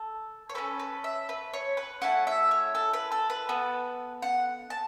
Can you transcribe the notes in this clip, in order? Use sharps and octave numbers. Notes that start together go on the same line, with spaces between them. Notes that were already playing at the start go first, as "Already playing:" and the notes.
Already playing: A4
C#5
C#4 E4 A4 B4
B4
E5
B4
C#5
B4
A3 C#4 E4 A4 F#5
E5
C#5
A4
B4
A4
B4
B3 A4
F#5
A5